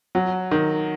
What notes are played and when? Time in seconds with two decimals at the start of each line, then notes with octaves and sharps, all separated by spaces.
0.15 F#3
0.51 D#3